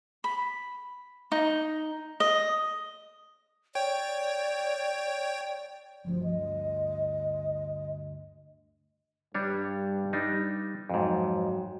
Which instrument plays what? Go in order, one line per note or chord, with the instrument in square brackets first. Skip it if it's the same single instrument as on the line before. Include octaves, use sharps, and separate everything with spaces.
[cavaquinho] B5
D#4
D#5
[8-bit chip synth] C#5 G5 [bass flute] D5
[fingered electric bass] G1 D2 [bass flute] F3
[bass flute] D#5
[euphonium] G2 [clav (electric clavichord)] G3 D4 C#5
[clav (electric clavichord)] G3 D4 D#4
[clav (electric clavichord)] F2 G#2 [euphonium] F#3